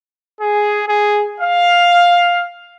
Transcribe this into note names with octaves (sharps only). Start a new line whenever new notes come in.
G#4
G#4
F5